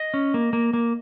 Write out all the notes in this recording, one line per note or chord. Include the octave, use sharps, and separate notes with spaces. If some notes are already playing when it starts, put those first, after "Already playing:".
Already playing: D#5
C#4
A#3
A#3
A#3